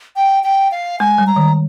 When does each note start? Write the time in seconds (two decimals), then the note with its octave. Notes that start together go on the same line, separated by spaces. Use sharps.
0.16 G5
0.44 G5
0.72 F5
0.99 G#3 G#5
1.18 G3
1.27 A#5
1.36 D#3